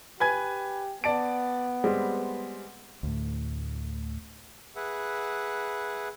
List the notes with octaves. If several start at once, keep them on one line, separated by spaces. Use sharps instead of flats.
G4 B4 G#5 G#6
B3 D5 A5 D7
G3 G#3 C4
D2 A2
G#4 B4 E5 F#5